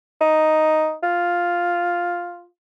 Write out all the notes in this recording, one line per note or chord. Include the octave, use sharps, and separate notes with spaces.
D#4
F4